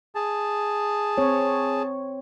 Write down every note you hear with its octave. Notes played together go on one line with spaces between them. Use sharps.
G#4 A5
C4 C#5